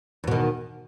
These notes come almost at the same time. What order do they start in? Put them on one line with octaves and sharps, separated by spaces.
E2 B2 D#3